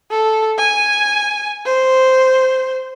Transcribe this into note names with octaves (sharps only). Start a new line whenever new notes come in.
A4
G#5
C5